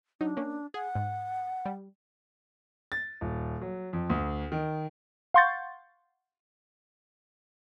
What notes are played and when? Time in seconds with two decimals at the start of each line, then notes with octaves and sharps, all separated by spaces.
0.21 F#3 D4 D#4
0.37 A#3 C#4
0.74 G#4 F#5
0.95 G#2
1.65 G3
2.92 A6
3.21 D#1
3.61 F#3
3.93 F2
4.10 D2
4.52 D#3
5.34 F5 F#5 C6 C#6 G6 A6